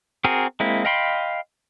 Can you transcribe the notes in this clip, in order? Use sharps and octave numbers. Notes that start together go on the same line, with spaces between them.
C4 F#4 G#4 A#4
G#3 A#3 C4 E4
D#5 F5 G5 B5 C6